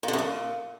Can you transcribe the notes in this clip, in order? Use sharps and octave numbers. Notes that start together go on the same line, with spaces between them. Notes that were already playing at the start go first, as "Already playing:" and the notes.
A#2
D3
F#2
A#2